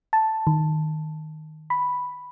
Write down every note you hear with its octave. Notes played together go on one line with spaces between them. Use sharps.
A5
D#3
B5